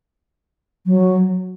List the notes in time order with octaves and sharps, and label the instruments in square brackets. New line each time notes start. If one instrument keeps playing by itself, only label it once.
[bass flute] F#3